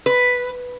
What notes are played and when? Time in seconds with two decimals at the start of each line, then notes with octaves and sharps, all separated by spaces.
0.06 B4